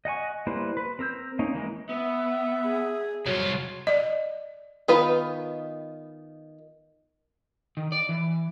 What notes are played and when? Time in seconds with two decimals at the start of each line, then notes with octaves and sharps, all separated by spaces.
0.05 D#5 F#5 G#5 C#6
0.47 G3 A#3 E4 B4 C5
0.77 B4
0.99 C4 A#4 E6 G6
1.39 A#3 C#4 D#4
1.54 E3 G#3 A#4
1.89 B3 E5
2.65 G#4
3.26 C2 F#3 F4 C#5
3.87 D5 D#5
4.88 D#3 B3 D#4 F4 B4
7.77 D#3
7.92 D5
8.09 E3